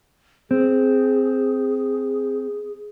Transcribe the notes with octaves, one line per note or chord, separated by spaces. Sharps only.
C4 G#4